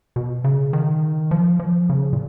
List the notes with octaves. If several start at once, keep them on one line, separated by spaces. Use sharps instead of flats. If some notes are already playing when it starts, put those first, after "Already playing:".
B2
C#3
D#3
F3
F3
C#3
A#2